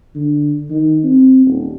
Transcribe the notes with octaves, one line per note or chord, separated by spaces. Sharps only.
D3
D#3
C4
D#1